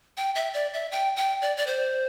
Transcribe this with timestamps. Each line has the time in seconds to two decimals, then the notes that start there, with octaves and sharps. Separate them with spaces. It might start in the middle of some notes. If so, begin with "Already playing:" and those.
0.17 G5
0.35 E5
0.54 D5
0.73 E5
0.92 G5
1.16 G5
1.42 D5
1.57 D5
1.67 C5